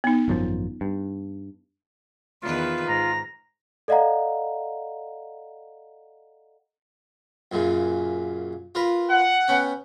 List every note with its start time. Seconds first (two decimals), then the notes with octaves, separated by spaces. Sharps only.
0.04 B3 D#4
0.28 G#1 F#2 F3
0.81 G2
2.42 E2 D#3 F4 B4
2.88 G#2 A#5
3.88 A4 D5 D#5 F5 F#5 A#5
7.52 F#2 A#2 C#3
8.75 F4 A#4 B4
9.10 F#5
9.48 B3 C#4 G5